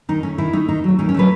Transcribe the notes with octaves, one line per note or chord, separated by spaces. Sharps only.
D#3 D#4
A3 C#4
D#3 E4
A3 D#4
D#3 D#4
F#3 A3
D#3 C#4
C#4
F#3 A3 B4